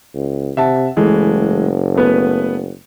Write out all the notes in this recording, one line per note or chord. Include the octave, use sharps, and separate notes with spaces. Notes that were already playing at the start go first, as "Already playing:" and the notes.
C#2
C3 E5 F#5 A5
F#1 E3 G#3 A3
A3 B3 B4